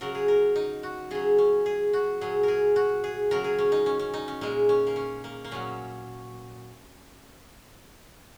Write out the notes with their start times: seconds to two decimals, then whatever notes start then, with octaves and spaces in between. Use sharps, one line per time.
0.01 C#3 F#3 A#4
0.15 G#4
0.28 A#4
0.56 D#4
0.83 F#4
1.11 C#3 F#3 G#4
1.38 C#4
1.66 G#4
1.93 F#4
2.21 A#2 F#3 G#4
2.43 G#4 A#4
2.76 F#4
3.04 G#4
3.31 C#3 F#3 A#4
3.44 G#4
3.58 C#4
3.72 D#4
3.86 C#4
3.99 C#4
4.14 D#4
4.28 C#4
4.41 A#2 G#3 A#3
4.69 C#4
4.87 A#3
4.96 C#4
5.24 A#3
5.44 A#3
5.51 A#2 F#3 C#4